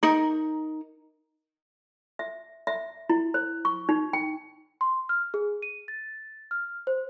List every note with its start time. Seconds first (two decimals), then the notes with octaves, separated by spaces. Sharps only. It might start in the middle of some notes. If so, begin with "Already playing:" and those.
0.03 D#4 A#4
2.19 E5
2.67 E5
3.10 E4
3.34 C5
3.65 C#6
3.89 D#4
4.13 G5
4.81 C6
5.09 F6
5.34 G#4
5.62 D#7
5.88 A6
6.51 F6
6.87 C5